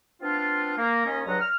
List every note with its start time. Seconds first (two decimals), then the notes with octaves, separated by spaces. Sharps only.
0.21 B3 C4 D4 F4
0.77 A#3
1.06 D#2 C#4 D#5
1.25 C#2 G2 F#3 D#5 F#5 A#5
1.40 F6